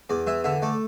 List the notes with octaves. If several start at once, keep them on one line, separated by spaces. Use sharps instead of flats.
E2 D5
E3 E5
D3 E5
A3 D5